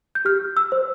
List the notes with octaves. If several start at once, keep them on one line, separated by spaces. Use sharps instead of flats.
G6
G4 F6
E6
C5